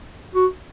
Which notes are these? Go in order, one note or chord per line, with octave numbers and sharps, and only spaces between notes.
F#4